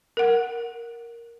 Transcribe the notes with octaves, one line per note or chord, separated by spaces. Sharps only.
A#4 F#5